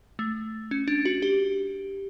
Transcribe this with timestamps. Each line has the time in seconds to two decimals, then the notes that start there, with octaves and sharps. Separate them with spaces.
0.19 A3
0.71 C#4
0.88 D4
1.05 F#4
1.22 G4